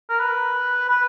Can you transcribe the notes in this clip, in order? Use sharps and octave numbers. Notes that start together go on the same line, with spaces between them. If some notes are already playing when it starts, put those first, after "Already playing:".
A#4
B4
B4